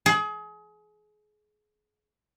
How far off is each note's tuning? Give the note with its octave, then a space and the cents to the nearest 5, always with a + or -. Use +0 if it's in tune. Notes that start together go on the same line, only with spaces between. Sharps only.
G#4 +30